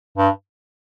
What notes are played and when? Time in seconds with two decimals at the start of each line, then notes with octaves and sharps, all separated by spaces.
0.17 G2